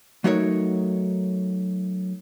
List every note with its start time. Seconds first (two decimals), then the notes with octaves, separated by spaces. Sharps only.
0.24 F#3 A3 D#4 F#4 A#4 C#5